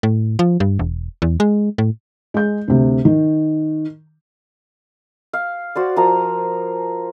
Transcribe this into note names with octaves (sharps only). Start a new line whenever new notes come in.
A2
F3
G2
E1
E2
G#3
A2
G#3 G6
D2 C3
D#3
F5
F#4 C5 D5
F3 A#4 A#5 D#6